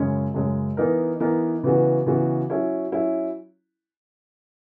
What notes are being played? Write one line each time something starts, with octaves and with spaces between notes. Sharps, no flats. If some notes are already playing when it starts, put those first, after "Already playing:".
Already playing: F#2 C#3 G#3 C#4
F#2 C#3 G#3 C#4
E3 B3 D#4 A#4
E3 B3 D#4 A#4
C#3 E3 B3 F#4
C#3 E3 B3 F#4
F#3 C#4 E4
F#3 C#4 E4